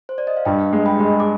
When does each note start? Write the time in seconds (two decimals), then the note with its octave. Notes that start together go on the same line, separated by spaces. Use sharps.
0.09 C5
0.18 D5
0.27 D#5
0.37 F5
0.45 G2 D#5 G5
0.73 G#3
0.86 G5 B5
1.00 G#3
1.20 D6